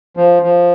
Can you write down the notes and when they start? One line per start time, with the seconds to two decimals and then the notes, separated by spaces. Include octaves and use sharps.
0.17 F3
0.43 F3